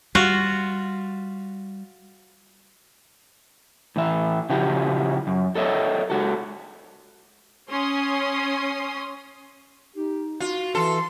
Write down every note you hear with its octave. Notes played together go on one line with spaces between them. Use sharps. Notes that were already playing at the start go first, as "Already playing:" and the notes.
G3 F4 F#4
A2 E3 E5
C#3 F3 E4 F#4 G4
F#2
A4 A#4 C#5 D#5 E5
G#3 F#4 A4
C#4 C6 D#6
D#4 G4
F4 F#4
E3 A4 C6